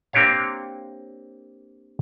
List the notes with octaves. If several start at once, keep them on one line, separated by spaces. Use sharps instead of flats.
A#3 C4 D4 G4 C#5 F5